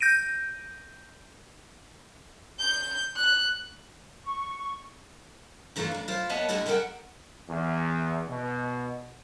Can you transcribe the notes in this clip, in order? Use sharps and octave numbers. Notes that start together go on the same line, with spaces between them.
G6 A#6 D7 D#7
G6
F#6
C#6
G2 E3 F#3 A3 E4 F4
F2 D4
E4 F4 C5
A#3 B3 C#5 D#5 E5 A5
D2 D3 G3 E4 G4 D#5
G3 G#3 A#4 E5 F#5 G5
E2
B2